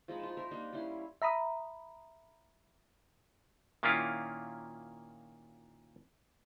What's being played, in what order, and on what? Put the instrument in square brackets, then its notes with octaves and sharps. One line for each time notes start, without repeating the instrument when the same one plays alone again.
[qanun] F3 G#3 D#4 B5
F4 A5
A#4 C5 E5
G3 A#3 D4 D#4
G3 C#4 E4 C6
[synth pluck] E5 A#5 B5 D#6
[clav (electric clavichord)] A#2 D#3 A#3 C#4 E4 F4